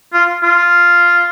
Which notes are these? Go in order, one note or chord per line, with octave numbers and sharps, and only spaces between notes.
F4
F4